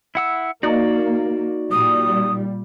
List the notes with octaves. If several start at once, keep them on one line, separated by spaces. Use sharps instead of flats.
E4 F#5 E6
A#3 D#4 F#4 D5
A#2 G3 D#6